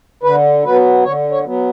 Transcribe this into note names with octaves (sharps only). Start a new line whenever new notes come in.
D3 B4
F#3 B3 B4
D3 C#5
C#5
F#3 B3